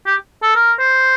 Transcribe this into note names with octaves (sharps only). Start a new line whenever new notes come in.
G4
A4
A#4
C5